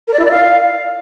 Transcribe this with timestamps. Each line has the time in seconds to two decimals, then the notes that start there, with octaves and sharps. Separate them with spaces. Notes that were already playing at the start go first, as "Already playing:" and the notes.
0.07 A#4
0.13 D5
0.19 E4
0.25 D5
0.31 F5